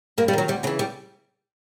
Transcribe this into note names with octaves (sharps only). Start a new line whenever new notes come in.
G2 A#3
G3
D#3 F#3
D2 G3
C#3 E3 G#3
G3